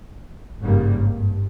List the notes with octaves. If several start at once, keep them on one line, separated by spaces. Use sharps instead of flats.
G#1 G2 C#3 G3 A#3
G2